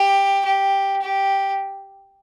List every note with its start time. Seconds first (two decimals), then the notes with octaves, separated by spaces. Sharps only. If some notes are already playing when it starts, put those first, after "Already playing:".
Already playing: G4
0.46 G4
1.02 G4